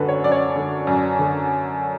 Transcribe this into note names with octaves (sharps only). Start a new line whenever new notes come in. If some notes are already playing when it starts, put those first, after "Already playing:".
Already playing: F#2 D3 F#4 A4 B4
C#5
F#2 D5
C#5
D5
D3
F#2
D3